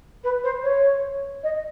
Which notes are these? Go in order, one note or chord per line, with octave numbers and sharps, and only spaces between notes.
B4
C5
C#5
D#5